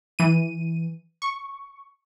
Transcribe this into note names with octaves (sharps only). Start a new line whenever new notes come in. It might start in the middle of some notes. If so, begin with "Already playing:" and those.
E3 D#7
C#6